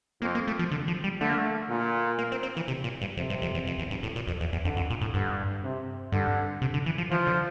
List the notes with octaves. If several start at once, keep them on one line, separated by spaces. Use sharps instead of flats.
F2 A#3
A#3
A3
F3
D3
F3
G3
D3 A3
A#3
A3
A#2
A#3
C4
C4
E3
C3
A#2
G2
F2 C3
G2
F2
E2
F2
E2
G2
A2
A#2
F2
E2
E2
F2 D3
F2
A#2
A2
G2 D3
C3
G2 D3
C3
D3
E3
F3
E3 F3
D3